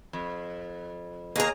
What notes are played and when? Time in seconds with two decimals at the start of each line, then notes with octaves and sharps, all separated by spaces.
0.13 F2
1.36 D#2 A#3 G#4 A#5